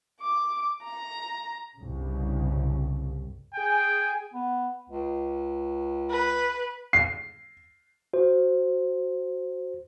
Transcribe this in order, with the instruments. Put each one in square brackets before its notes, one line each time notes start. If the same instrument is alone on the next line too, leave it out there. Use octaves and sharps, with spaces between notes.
[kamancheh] D6
A#5
[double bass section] C2 G2 C#3
[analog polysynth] G#4 G#5 [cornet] G5
[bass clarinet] B3
C#2
[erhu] B4
[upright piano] C7
[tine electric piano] F#4 C5